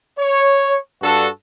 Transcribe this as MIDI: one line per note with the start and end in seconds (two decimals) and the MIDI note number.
0.19 0.78 73
1.02 1.28 43
1.02 1.28 62
1.02 1.28 66
1.02 1.28 69